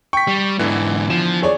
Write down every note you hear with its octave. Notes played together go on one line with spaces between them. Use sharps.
G5 C#6 B6
G3
E2 G#2 D3 E3 B3
F3 E7
G#4 C#5 D5